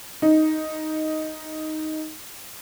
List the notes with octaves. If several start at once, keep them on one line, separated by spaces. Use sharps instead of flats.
D#4